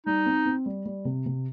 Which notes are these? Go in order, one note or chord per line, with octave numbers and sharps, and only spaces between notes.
G3 D#4
C4
C4
G3
G3
C3
C3